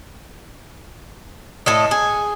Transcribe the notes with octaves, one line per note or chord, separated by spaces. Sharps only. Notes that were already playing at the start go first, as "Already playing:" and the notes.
A2 A4 D#5
G#4